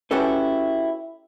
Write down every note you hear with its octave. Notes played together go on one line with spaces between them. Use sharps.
C#4 E4 F#4 G4 A4 B4